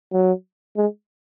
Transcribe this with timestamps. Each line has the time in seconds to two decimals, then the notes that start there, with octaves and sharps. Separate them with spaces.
0.12 F#3
0.77 G#3